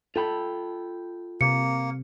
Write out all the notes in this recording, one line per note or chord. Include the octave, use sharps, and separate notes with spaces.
F4 A4 G5 B5
C3 A#3 C#7